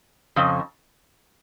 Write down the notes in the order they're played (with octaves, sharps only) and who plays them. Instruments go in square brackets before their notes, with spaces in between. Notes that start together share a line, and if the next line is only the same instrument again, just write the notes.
[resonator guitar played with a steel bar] F2 C#3